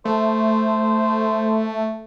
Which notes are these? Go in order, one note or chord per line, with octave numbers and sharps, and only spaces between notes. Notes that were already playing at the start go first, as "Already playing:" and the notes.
A3 C5